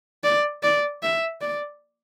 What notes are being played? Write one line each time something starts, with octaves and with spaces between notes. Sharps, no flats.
D5
D5
E5
D5